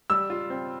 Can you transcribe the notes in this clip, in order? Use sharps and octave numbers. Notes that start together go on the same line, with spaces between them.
G3 E6
F4
C4